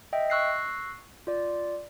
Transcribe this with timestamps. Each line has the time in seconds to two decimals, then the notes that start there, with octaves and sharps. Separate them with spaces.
0.13 D#5 E5 G5
0.30 C#6 E6 F#6 A#6 C7
1.27 F4 D5